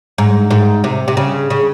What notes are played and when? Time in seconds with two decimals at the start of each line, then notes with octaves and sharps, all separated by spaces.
0.18 G#2
0.51 G#2
0.84 C3
1.08 C3
1.17 C#3
1.50 C#3